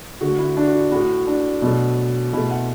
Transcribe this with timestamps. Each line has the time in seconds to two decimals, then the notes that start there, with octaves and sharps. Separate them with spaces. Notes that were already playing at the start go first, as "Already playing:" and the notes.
0.21 D3 A3 F#4
0.38 E4
0.57 D4
0.67 F#4
0.74 E4
0.92 A2 A3 F#4
1.27 D4
1.62 B2 F#3 A3
2.33 B2 A3 E4
2.51 F#5